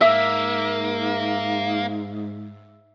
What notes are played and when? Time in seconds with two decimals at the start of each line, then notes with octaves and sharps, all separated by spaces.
0.01 G#2 A#3 E5